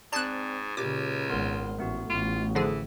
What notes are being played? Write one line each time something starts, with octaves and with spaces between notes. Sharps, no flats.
G#2 C4 D5 A5 F#6
C#2 A#2 C#3 G4 D6
G#1 B3 C6 F6
A1 A3 B3 F#4
A1 F4
D3 E3 F3 G#4